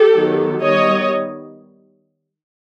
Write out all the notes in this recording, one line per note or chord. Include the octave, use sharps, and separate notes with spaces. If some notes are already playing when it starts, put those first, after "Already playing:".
Already playing: G4 A4
D#3 F#3 B3
D#3 G3 B3 C#5 D#5